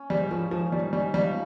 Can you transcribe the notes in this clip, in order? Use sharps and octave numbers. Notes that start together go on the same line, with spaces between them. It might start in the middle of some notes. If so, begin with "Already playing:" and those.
Already playing: C#4
G#2 G3
F3 C#4
G#2 F3
G3 C#4
G3 C#4
F3 G3